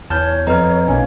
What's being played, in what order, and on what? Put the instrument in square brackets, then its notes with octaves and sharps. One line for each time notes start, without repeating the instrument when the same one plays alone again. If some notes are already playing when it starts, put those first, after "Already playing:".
[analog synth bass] E2 [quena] C#5 [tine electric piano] A5 F6 G6
[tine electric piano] F2 F6 [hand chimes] B4 D#5 A#5
[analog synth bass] B1 [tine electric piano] A#3 C#4 [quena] C#5